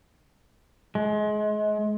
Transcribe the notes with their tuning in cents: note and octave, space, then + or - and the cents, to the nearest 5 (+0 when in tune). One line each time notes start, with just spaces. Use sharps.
G#3 +30